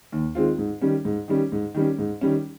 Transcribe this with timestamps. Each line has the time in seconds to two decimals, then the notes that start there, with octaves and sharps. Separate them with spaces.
0.12 D#2
0.35 D#3 G#3 C4 F4
0.58 G#2
0.81 D#3 G3 C#4
1.05 G#2
1.28 D#3 G3 C#4
1.52 G#2
1.75 D#3 G3 C#4
1.98 G#2
2.21 D#3 G3 C#4